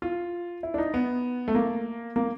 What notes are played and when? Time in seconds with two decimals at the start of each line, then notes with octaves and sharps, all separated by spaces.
0.02 F4
0.63 E4
0.74 D4
0.78 D#4
0.94 B3
1.48 A3
1.54 A#3
2.16 A#3